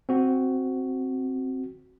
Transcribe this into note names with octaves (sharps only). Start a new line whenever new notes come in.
C4 F#4